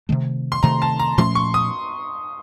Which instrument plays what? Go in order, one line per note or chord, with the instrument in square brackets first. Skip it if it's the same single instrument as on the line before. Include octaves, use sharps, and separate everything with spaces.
[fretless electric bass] C3 D#3 A3
[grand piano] C6
[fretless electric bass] C3 D#3 A3 [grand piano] A#5
[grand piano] A5
A#5
[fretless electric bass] A#2 F3 A3 C#4 [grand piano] C6
[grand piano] C#6
D#6